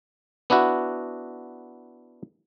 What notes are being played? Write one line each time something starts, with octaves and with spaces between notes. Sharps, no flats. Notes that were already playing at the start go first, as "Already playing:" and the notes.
B3 D4 E4 F#4